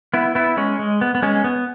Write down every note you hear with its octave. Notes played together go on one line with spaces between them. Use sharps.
B3 E4
B3 E4
G#3 C#4
G#3
B3
B3
G#3 C#4
B3